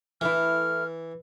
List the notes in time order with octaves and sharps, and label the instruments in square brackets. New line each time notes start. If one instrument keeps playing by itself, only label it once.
[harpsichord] E3 [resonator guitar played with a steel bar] A3 E4 [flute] F6